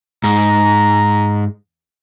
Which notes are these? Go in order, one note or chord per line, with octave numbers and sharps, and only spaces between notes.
G#2 A#5